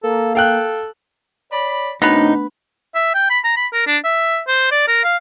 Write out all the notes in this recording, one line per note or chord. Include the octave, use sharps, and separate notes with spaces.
A#3 A4
A4 F5 G5 F#6
C#5 D5 B5
F#2 C3 A3 B3 D4 D#4 B4 F#5
E5
G5
B5
A#5
B5
A#4
D4
E5
C5
D5
A#4
F5